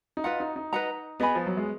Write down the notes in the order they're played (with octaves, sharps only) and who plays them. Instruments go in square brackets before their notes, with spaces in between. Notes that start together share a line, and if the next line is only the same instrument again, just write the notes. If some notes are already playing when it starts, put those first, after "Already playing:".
[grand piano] D#4
[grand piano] F4 [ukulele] B4 D#5 F#5 A#5
[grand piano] D#4
D#4
[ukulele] B4 D#5 F#5 A#5
[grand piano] B3 [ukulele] G#4 D#5 G#5 B5
[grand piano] F3
F#3
G#3